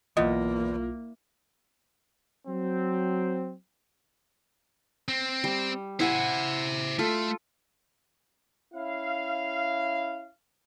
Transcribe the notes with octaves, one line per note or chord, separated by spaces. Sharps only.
B1 E2 A#3 F4 D#5
F#3 C4
C4
G3
E4 C5 E5 F#5 G#5
A3 F4 A4
C#4 E4 F5